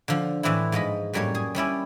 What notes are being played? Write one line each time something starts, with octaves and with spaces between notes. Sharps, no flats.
D3 F3
A2 E3 C4 D4 E4
G#2 F3 D#5 B5
F#2 A2 G3 A#3 C#5
G#4 G#5
G3 C#4 E4 D5